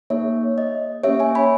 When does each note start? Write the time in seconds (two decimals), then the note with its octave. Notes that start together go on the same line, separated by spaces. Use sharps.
0.10 A#3 D#4 G#4 C#5 E5
0.58 D#5
1.04 A#3 C#4 G4 C#5 E5
1.20 E5 G#5
1.35 G#5 B5